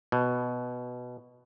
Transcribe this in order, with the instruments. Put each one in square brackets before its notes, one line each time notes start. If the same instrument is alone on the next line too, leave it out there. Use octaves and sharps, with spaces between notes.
[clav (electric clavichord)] B2